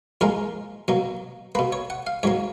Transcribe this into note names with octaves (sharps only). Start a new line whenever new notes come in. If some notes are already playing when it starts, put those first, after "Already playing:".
A#2 F3 G#3 A#4
B2 F#3 A#3
B2 A#3 B4
C#5
F#5
F5
G#2 F#3 A#3 C#5